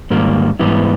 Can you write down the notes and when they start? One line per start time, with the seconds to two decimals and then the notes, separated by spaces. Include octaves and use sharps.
0.10 G#2 D#3 G3 A#3
0.59 G#2 E3 G3 B3 E4